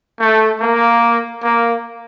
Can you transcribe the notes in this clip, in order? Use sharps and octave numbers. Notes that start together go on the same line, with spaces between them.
A3
A#3
A#3